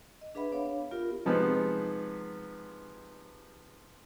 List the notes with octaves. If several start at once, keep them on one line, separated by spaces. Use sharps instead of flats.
D#5
D4 G#4 B4 E5 F#5 B5
B3 D4 C#5 F5
B3 F4 G4 A#4
C3 F3 G#3 B3 D#4